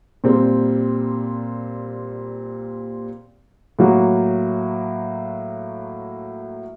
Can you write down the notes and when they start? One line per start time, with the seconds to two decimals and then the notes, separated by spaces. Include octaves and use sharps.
0.24 A#2 G3 C4
3.79 A2 F#3 A#3 F#4